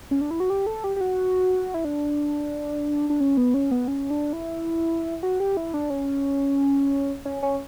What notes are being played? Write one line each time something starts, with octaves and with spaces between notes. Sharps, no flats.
C#4
D4
E4
F#4
G4
A4
G4
G4
F#4
E4
D4
D4
C#4
B3
C#4
B3
C#4
D4
E4
F#4
G4
E4
D4
C#4
C#4
C#4